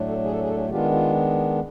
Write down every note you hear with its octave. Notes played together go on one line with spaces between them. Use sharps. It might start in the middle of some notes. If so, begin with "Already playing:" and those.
Already playing: A2 F#3 A3 D4
A4
G#4
A4
G#4
A4
G#4
D#3 G#3 B3 D4 F4 G4
F4